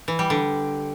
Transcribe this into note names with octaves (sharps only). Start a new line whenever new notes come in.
E3
G3
D3